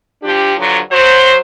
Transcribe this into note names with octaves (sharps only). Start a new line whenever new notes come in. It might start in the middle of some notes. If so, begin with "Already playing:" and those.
F3 D4 G4
G2 D3 F3 F#3
F#3 C5